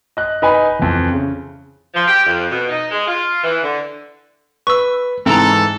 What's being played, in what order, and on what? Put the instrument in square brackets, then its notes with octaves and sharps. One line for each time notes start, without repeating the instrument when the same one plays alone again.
[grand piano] D#5 F#6
D#4 B4 G#5 B5
F2 E3
C#3
[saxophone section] F3
G4
F2
B2
D#4
G#3
F4
E3
D3
[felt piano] B4 [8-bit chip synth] C#6 E6
[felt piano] G#2 E3 [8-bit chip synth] C4 A#5 [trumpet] A4